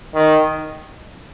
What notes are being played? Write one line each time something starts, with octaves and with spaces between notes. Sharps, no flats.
D#3